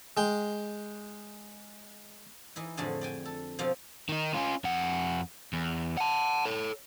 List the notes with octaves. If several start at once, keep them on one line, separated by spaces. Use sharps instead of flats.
G#3 G5
E3 D#4 E4
F2 A2 D3 F#4 G#4 A5
D5 G5 G#5
A4
B2 F3 C4 G4 F5
D#3 D#4
C#4 F4
F2 F#5
E2
F#5 A5
A4 C#5